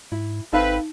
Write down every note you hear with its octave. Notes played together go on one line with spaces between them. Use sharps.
G#2 E4
G#1 C4 D#4 A4 B4 E5 F5